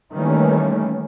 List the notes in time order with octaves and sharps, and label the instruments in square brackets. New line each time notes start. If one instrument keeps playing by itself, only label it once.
[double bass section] D#3 E3 G3 A3 A#3 C#4